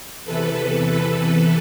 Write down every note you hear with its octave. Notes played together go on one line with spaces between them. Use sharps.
E2 C3 E3 A4 B4